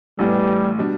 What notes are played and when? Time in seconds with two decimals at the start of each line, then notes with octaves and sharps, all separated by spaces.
0.19 A1 A2 E3 G3 B3
0.79 B2 G3 D4